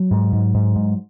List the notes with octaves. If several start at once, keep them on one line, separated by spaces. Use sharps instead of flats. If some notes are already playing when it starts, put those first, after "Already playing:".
Already playing: F#3
G#2
G#2
G#2
G#2